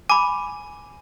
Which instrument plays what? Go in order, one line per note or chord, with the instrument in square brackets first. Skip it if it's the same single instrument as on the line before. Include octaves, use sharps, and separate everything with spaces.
[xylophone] G#5 [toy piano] B5 D6